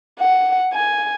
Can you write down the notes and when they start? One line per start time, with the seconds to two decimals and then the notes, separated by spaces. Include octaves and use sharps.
0.19 F#5
0.73 G#5